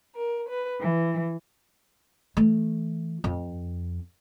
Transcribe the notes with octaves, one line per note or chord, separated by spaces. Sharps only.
A#4
B4
E3
E3 A3
F2